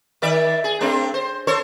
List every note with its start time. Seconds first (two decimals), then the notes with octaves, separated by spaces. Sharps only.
0.22 D#3 D5 E5
0.64 G#4
0.81 A3 C4 D4
1.14 C5
1.47 A4 C5 C#5